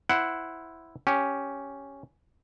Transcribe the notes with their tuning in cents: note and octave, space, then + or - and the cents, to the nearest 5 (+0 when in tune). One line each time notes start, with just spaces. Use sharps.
E4 +0 C5 +0 F#5 +0
C#4 +0 G4 +0